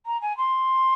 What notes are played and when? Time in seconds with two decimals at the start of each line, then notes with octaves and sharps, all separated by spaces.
0.06 A#5
0.22 G#5
0.37 C6